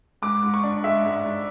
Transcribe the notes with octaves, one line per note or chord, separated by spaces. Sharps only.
G#2 D6
G#2
C#6
D4
G#3 E5
G#2
G#2